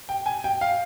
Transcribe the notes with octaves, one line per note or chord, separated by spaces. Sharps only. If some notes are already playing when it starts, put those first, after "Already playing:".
G5
G#5
G5
F5